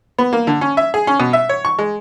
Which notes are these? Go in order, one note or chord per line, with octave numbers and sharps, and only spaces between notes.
B3
A#3
D3
C#4
E5
G#4
C#4
B2
E5
C#5
C#6
G#3